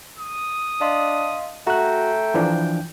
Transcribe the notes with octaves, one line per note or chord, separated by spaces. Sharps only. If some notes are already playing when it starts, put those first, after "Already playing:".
D#6
D4 D#5 F5 C6
A3 F#4 G5 A#5 F#6
E3 F3 D4